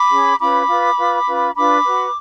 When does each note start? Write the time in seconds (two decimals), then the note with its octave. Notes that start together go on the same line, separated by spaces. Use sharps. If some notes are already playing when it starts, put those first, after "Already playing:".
Already playing: B5 D6
0.09 C#4 G#4 C#5
0.39 C#4 F4 B4 B5 D6
0.67 F4 B4
0.97 F4 B4
1.26 C#4 F4 B4
1.55 D4 F4 B4 B5 D6
1.84 F#4 B4